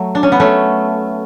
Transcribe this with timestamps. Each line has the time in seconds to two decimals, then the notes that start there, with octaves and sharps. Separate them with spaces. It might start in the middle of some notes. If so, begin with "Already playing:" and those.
Already playing: F#3 A3
0.15 D4
0.23 C#4
0.32 B3
0.40 A3 C#4